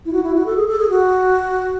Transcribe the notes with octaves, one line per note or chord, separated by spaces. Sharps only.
E4
F#4
E4
F#4
A4
G#4
A4
G#4
F#4